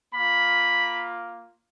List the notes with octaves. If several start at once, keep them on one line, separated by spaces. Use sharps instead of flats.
A#3 F4 B5